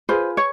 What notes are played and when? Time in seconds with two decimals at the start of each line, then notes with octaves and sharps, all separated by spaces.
0.09 F4 G#4 B4 C5
0.37 C#5